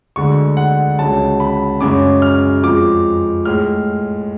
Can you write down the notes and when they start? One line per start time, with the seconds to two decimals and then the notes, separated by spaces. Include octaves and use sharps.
0.16 D2 D3 G#3 C#6
0.57 F#5
0.98 C#2 C#3 F#3 A5
1.40 B5
1.81 F#2 C#3 G#3 D6
2.22 F6
2.63 F2 F3 G#3 D6
3.45 A2 G#3 F6